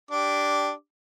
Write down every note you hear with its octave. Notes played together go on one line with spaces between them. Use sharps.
D4 G4 D6